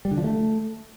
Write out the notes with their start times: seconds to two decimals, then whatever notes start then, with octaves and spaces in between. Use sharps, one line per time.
0.05 G3
0.11 D3
0.17 F3
0.24 A3